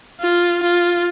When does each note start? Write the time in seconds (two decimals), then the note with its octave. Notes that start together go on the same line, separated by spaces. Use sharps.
0.21 F4
0.63 F4